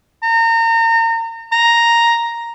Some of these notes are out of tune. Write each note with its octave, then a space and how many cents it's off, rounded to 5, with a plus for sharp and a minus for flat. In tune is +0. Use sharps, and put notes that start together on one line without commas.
A#5 -35
A#5 +0